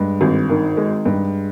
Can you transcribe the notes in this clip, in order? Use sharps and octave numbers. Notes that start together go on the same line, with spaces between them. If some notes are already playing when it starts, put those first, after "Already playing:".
Already playing: G2 G#3
G#1
D#3
G#3
G2